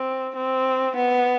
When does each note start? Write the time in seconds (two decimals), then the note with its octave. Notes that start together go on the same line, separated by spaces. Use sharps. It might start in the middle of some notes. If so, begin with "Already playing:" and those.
Already playing: C4
0.36 C4
0.96 B3